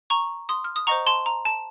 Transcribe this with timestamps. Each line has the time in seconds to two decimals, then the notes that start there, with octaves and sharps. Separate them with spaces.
0.10 A#5 C#6
0.49 C6 D#6
0.64 F6
0.76 D#6
0.87 C5 D#5 F#5 A#5 C#6
1.07 A5 C6
1.26 A#5
1.45 A5